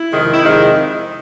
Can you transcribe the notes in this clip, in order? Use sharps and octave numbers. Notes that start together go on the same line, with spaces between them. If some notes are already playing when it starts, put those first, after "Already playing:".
Already playing: E4
F2 C3 D#3 G#3
E4
F2 C3 D#3 G#3 D#4